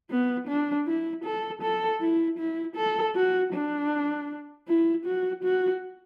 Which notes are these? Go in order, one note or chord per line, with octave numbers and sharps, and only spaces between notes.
B3
D4
E4
A4
A4
E4
E4
A4
F#4
D4
E4
F#4
F#4